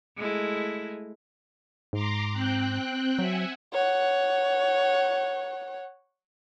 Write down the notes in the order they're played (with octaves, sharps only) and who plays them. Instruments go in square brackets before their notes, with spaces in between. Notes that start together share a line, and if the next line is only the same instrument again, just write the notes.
[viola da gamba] G#3 A3 E4
[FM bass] G#2 [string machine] A#5 C6 D6
[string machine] C4 G5 F#6
[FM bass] F#3 [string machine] E5 F#5 G#5
[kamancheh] C#5 F#5